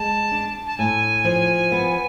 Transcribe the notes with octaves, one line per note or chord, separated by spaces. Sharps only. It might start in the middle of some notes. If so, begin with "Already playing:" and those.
Already playing: G#3 A5
D4
A5
A2 G#5
F3
B3